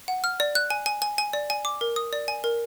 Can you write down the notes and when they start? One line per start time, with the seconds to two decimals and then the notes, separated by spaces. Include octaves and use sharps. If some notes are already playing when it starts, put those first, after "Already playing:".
0.08 F#5
0.24 F6
0.40 D5
0.55 F#6
0.70 G#5
0.86 G#5
1.02 G#5
1.18 G#5
1.33 D5
1.50 G#5
1.65 D6
1.81 A#4
1.96 D#6
2.13 D5
2.28 G#5
2.44 A#4